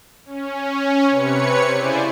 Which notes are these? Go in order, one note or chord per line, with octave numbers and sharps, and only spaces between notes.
C#4
C3 B4 C#5 C#7
C#3 E4 C5 D5 G#5